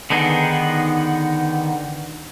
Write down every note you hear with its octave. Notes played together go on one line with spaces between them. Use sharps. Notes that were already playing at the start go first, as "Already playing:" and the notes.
D3 D#3 B3 D#4 G#4